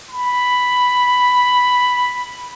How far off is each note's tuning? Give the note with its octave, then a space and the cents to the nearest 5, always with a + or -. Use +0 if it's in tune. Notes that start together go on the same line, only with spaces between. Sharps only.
B5 +5